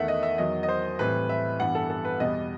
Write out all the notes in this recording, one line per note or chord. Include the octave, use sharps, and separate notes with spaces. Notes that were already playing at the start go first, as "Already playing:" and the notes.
Already playing: E2 D#3 A3 E5 F#5
D#5
E5
E2 D#3 F#3 D#5
D#5
C5
A2 E3 G3 C4 B4
E5
G2 E3 G3 B3 F#5
A4
A4
B4
E2 B2 G3 B3 D#5